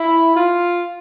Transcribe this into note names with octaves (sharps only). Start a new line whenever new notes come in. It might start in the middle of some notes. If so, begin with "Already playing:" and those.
Already playing: E4
F4